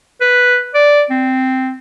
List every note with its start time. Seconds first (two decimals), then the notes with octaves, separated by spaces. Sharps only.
0.21 B4
0.74 D5
1.10 C4